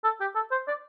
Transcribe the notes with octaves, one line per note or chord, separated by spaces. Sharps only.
A4
G4
A4
C5
D5